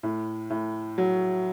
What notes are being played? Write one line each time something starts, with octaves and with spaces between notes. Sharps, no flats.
A2
A2
F#3